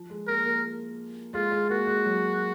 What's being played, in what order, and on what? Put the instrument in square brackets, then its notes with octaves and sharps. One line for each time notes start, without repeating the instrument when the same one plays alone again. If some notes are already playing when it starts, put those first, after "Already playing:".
Already playing: [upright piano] F3
G#3
[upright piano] A#3 [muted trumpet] A#4
[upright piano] A#3
[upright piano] G#3 [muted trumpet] F4
[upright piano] G#3
[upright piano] A#3 [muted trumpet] F#4
[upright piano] G#3
F#3